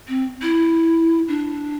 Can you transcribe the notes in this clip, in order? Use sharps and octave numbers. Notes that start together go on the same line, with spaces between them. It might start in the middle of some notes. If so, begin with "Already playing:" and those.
C4
E4
D4